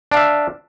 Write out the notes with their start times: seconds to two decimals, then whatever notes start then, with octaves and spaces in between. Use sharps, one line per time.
0.12 D4
0.14 F5
0.17 E5